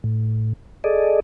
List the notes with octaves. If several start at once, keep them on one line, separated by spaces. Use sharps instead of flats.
A2
G#4 A4 D5 D#5